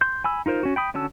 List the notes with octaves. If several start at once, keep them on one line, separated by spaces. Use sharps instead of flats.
C6 G6
G#5 B5 E6
D#4 F4 A#4 C5
C#4 F#4
G5 B5 D#6
D3 C#4 F#4 A5 E6